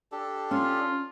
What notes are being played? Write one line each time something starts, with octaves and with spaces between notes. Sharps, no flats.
D4 G4 A4
C#4 F4